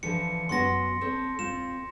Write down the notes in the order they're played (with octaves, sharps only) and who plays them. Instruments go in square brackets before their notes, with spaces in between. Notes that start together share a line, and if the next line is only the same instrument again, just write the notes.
[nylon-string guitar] D3 E3 F3 [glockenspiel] C#7
[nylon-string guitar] F#2 B3 F#4 [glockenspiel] C6 A#6
[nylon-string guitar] C4 A4 C#5
[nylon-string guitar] C4 F4 [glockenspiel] E7